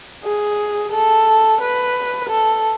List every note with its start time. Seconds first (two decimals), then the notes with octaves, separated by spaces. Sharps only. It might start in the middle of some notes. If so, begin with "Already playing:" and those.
0.24 G#4
0.92 A4
1.61 B4
2.29 A4